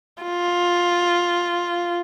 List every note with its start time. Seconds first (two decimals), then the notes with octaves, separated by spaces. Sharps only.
0.23 F4